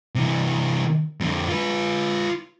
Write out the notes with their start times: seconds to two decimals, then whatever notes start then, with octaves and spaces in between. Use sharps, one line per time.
0.15 C3 E3
1.21 F2 D3
1.48 F4 B4